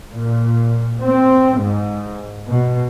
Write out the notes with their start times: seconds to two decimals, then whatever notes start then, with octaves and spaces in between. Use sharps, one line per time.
0.12 A#2
1.03 C4
1.60 G#2
2.48 B2